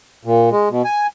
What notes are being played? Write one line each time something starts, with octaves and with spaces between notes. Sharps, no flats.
A#2
G#3
B2
G#5